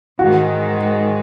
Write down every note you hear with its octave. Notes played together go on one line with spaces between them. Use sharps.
G#2 D#3 G#3 F#4